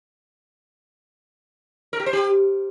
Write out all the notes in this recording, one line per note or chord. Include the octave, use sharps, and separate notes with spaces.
A#4
G4
C5
G4